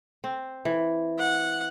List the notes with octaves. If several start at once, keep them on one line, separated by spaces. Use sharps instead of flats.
C4
E3
F#5